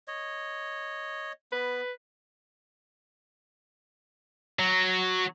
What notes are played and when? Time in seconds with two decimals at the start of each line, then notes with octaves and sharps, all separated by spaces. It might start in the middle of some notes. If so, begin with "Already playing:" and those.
0.08 C#5 D#5
1.52 B3 B4
4.59 F#3